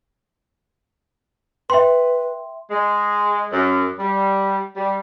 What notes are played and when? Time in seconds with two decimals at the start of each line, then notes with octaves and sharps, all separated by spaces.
1.70 B4 E5 G5 C6
2.71 G#3
3.53 F#2
3.99 G3
4.76 G3